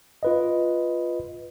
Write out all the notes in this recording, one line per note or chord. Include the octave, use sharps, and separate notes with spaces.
F4 B4 D#5